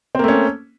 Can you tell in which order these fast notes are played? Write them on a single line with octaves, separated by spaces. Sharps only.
C4 A#3 A3 C#4